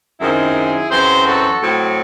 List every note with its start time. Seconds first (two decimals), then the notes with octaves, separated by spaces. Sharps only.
0.20 F#2 D#3 G#3 C4 E4 G#4
0.90 F#2 E3 C4 G#4 C5
1.25 F#4 A4
1.62 A2 F#3 C4